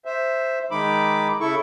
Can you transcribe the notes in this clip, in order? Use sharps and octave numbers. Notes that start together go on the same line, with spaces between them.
C5 E5
D#3 G#3 D#4 B5 D6
C#3 E4 A4 C#6